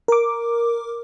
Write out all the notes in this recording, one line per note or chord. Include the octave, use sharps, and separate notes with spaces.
A#4 D6